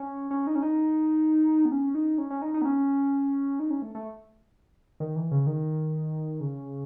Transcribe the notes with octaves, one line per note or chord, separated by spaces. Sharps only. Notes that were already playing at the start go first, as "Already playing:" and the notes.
Already playing: C#4
C#4
D#4
C#4
D#4
B3
C#4
D#4
C#4
C#4
D#4
D#4
B3
C#4
D#4
C#4
A3
A3
D#3
E3
C#3
D#3
C#3